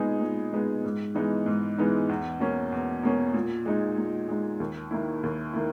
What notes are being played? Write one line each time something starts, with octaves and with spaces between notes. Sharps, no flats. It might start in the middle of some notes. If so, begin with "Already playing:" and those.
Already playing: A#2 G#3 B3 D#4 G#4
A#2
G#3 B3 D#4 G#4
G#2
E3 G#3 B3 D#4
G#2
E3 G#3 B3 D#4
E2
B2 A#3 C#4
E2
B2 A#3 C#4
A#2
G#3 D#4
A#2
G#3 D#4
D#2
D#3 A#3 E4
D#2
D#3 A#3 E4